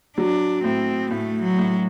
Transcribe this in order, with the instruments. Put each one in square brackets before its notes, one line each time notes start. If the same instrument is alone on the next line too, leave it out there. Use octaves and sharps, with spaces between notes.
[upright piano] F#3 [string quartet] D4
[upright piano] A2 [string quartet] C4
[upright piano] A2 [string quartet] A3
[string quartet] F#3
[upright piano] A2